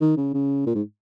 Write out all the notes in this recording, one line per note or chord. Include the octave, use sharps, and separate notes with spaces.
D#3
C#3
C#3
A#2
G#2